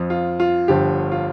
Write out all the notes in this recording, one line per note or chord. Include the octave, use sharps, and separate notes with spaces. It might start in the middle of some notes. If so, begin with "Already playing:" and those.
Already playing: F2 F3
F4
F4
G1 G2 D3 F3 G4
F4